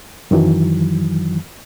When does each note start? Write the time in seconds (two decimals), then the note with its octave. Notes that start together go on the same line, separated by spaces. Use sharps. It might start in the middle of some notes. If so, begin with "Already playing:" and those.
0.31 F#2 D#3 E3 F#3